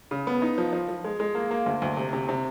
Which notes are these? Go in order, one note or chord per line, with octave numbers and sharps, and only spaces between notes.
C#3
B3
D#4
F3
F3
F3
G#3
G#3
A#3
A#3
D2
D2
C3
C3
C3